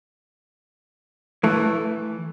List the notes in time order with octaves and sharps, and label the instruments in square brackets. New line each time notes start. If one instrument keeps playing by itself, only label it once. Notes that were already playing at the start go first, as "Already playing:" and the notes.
[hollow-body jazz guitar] E3 [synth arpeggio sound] A3